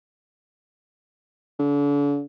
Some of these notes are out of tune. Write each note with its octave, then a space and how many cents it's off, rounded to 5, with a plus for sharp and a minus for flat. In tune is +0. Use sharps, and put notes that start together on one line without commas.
D3 -40